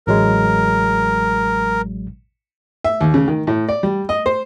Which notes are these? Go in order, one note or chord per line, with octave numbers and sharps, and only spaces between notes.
A1 F#3 G#3 A#4
E5
D#2
C#3
D#3
A2
D5
G3
D#5
C5